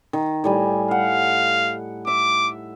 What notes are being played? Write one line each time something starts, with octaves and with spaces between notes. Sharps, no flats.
D#3
A2 G3 G#5
F5 F#5
E5 D6